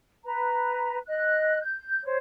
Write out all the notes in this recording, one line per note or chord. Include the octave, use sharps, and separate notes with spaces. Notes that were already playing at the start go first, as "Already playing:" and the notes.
B4 A#5
D#5 F#6
G6
C5 C#5